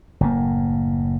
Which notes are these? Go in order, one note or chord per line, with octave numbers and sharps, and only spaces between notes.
F#1 A2 A#3